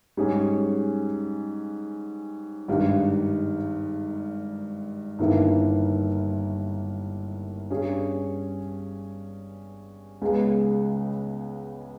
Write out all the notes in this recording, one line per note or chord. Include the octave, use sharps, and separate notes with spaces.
G#2 G3 C#4 G#4
G#1 G2 D#3 G3
G1 G2 D#3 A#3 E4
G2 G3 C#4 G#4
C#2 C#3 G#3 B3